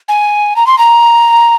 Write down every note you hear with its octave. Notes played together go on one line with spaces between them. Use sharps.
G#5
A#5
C6
A#5